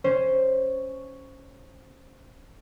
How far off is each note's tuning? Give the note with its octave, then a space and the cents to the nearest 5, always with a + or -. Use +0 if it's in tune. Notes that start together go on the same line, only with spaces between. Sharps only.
C#4 +0 C5 +0